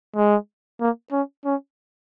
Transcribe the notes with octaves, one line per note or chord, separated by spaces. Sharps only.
G#3
A#3
C#4
C#4